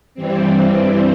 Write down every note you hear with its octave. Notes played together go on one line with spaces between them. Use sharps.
G2 E3 G3 C4